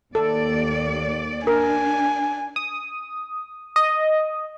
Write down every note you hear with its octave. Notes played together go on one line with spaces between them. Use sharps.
D#2 A4 D5
D4 A#4 G#5
D#6
D#5